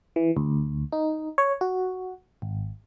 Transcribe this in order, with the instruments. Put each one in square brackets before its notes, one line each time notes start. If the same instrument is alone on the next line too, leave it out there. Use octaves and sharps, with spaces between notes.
[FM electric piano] E3
D2
D#4
C#5
F#4
G#1